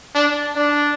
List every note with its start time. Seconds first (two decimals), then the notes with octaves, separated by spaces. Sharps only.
0.15 D4
0.56 D4